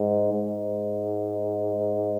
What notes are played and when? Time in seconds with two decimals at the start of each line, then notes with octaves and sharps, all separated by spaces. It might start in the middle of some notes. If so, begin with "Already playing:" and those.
Already playing: G#2
0.33 G#2